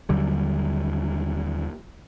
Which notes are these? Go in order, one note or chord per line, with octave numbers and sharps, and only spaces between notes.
D#2 D3 F#3 G3